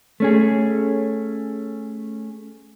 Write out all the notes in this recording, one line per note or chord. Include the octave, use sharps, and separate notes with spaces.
A3 C#4 G#4